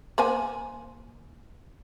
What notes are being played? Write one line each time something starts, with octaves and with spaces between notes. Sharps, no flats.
A#3 C5 G#5